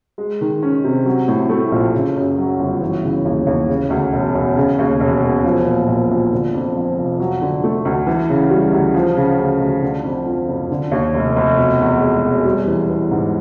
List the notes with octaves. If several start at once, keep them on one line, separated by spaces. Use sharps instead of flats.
G#3
D#3
C#4
C3
F#3
A2
A3
A#1
C#3
F#2
F#3
G1
E3
C#3
D#2
D#2
C#3
D2
E1
E1
C#3
D#2
E1
E1
F3
A#2
A#1
A#1
D3
F2
F3
F1
F#3
D3
A3
D2
E3
C#3
G3
D2
F3
C#3
D2
D2
D3
F2
F3
F#1
D3
D#2
F1
F1
B2
E2
G#3
E1
G3
E3
B3
G#2